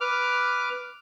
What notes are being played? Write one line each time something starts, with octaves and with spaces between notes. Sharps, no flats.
B4 D6 F6